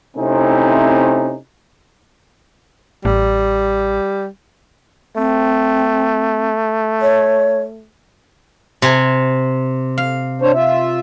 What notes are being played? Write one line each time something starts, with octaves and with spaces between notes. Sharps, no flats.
C3 A3 C4 C#4 D#4 E4
A1 G3
A3 C4
C#5
C3 G#5
F5
D4 C5 C#5
F4 E5